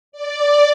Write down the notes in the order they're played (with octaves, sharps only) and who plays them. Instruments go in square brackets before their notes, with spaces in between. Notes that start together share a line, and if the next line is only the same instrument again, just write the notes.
[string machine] D5